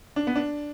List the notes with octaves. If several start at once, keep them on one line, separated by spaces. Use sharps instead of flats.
D4
B3
D4